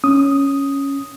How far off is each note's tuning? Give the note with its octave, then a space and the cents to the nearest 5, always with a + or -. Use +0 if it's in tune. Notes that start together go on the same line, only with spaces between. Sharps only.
C#4 +0 D#6 +0